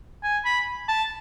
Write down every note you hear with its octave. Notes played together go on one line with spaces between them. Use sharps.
G#5
B5
A5